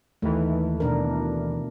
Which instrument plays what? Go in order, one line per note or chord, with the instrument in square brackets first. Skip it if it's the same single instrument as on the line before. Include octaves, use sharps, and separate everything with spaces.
[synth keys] D#2 D#3 E3 [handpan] A3
[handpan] B2 D4 A#4